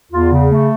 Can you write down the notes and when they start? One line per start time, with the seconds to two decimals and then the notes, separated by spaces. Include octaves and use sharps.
0.12 E2 F4
0.31 C#3
0.51 A3